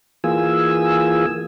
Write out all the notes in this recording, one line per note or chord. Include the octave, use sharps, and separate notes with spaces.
E3 A#3 F4 G#4 G#5 E6